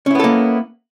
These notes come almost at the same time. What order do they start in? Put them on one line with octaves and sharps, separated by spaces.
C#4 E4 B3 A4 A#3